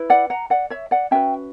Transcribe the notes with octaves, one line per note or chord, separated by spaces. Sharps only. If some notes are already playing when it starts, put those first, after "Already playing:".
Already playing: E4 B4
D5 F#5
F#5 A#5
D5 F#5
C#5 E5
D5 F#5
C#4 F#4 B4 E5 G5